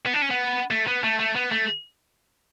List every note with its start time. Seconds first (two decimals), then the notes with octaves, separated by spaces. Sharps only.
0.06 B3
0.14 D4
0.22 C#4
0.31 B3
0.71 A3
0.87 B3
1.04 A3
1.19 A3
1.36 B3
1.52 A3